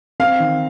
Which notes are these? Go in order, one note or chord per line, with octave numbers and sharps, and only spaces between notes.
C4 F5
D#3